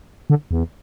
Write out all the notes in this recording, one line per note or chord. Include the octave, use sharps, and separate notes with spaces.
D3
E2